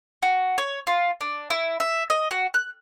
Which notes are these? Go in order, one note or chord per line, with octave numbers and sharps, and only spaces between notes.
F#4
C#5
F4
D4
E4
E5
D#5
F#4
F#6